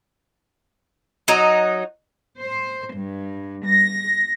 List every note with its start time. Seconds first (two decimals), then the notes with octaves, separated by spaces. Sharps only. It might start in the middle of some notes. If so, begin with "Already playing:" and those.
1.28 F#3 D#4
2.38 C5
2.94 G2
3.64 A#6